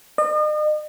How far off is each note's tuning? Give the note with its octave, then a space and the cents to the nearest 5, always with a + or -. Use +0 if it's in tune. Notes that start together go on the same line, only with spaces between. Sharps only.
D#5 -40